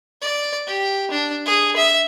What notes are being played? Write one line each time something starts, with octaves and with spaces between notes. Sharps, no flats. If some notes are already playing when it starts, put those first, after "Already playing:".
D5
G4
D4
G#4
E5